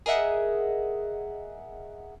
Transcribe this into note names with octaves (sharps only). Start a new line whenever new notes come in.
G#4 A#4 D#5 E5 F#5